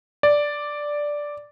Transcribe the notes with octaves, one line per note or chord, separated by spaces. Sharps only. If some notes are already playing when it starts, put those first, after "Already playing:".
D5